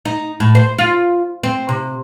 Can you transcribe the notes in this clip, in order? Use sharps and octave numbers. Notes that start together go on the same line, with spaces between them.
D#4
A2
C5
F4
C4
C3